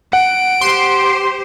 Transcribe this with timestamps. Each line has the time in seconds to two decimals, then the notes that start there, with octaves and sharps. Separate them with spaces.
0.13 F#5 D7
0.61 G4 C5 C6